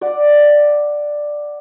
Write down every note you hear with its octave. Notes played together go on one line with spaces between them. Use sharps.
D5 F#5 D6